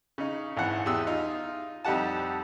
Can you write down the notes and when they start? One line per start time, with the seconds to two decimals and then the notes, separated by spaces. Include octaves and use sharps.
0.18 C#3 D#4
0.57 G#1 E3 F#5
0.86 E2 G4 G#4 C6 E6
1.07 D#4 F4
1.85 F2 G3 D#4 G4 F#5 A5